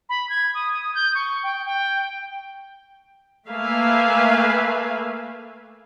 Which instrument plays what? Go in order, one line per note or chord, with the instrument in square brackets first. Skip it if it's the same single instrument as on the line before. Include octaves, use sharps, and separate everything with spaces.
[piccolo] B5
G#6
D#6
D#6
G6
C#6
G5
G5
[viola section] A3 A#3 B4 E5 F5 G#5